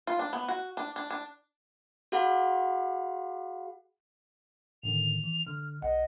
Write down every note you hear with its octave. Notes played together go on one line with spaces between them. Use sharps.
F4
D4
B3
F#4
D4
D4
D4
F#4 G#4 F5 F#5 B5
A2 D3 D#3 F7
E3
D3 F6
B1 D#5 F#5